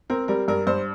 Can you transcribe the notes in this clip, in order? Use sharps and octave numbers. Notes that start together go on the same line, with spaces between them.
C4 A#4
G3 A#4
G2 A#4
G2 C5